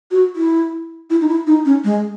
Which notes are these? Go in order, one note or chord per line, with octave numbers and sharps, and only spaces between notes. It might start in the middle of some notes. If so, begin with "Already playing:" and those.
F#4
E4
E4
D#4
E4
D#4
C#4
G#3